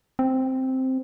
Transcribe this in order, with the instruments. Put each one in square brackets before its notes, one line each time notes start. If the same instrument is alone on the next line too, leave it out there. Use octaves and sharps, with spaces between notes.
[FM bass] C4